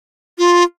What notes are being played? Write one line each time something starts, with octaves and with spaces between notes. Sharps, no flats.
F4